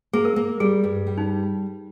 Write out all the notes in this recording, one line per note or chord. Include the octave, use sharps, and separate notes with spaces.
A#3 G#4
A#4
A#3
G3 G#4
G2
G3
D#4